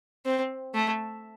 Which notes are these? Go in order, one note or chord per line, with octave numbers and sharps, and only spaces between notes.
C4
A3